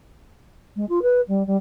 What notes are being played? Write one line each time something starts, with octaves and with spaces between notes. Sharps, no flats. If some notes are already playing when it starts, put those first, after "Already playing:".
G#3
F4
B4
G3
G3